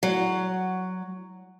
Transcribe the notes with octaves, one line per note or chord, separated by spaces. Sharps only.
F#3